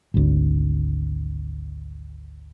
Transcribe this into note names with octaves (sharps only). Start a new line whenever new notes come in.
G#1 D2